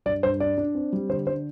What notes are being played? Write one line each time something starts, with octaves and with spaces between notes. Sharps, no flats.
G2 D5
G2 C5
D4 D5
D4
C4
G3
D3 C5
D4 C5